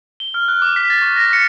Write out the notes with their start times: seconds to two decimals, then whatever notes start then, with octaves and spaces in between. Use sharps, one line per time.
0.20 G7
0.34 F6
0.48 F#6
0.62 D6
0.76 B6
0.90 A6
1.02 C#6
1.16 A#6
1.33 C#7